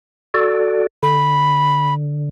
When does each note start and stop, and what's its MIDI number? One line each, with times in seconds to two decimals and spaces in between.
0.34 0.87 66
0.34 0.87 69
0.34 0.87 74
1.03 2.29 50
1.03 1.94 83